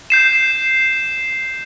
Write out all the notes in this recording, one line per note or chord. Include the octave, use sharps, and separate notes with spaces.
G6 C7 E7